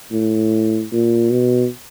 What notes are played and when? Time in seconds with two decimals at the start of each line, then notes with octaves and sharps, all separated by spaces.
0.12 A2
0.92 A#2
1.31 B2